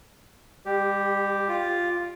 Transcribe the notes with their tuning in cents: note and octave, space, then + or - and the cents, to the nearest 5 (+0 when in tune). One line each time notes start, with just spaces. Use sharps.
G3 +40 G4 +0
F4 +0 D6 +0